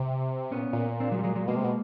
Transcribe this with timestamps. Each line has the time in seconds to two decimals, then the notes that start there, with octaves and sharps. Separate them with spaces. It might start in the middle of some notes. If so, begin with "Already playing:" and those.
Already playing: C3
0.52 A#2 B3 C#4
0.73 A#2
1.00 C4 D4
1.12 F#3 G#3
1.19 G3
1.24 F#3 G#3
1.36 F#3 G#3
1.48 B2 G#3 A#3
1.56 C3
1.64 B2